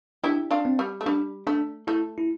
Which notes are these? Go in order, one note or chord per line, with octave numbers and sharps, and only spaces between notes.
D4 E4 G4
D4 F4
C4
G3
A3
G3 D4
A3 D4
A3 E4
E4